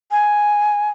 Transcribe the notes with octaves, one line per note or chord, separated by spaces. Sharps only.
G#5